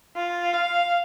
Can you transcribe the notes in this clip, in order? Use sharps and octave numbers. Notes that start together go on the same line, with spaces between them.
F4
F5